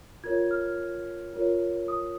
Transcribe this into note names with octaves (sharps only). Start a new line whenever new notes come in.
F4 A#4 C#5 G#6
F6
F4 A#4 C#5
D#6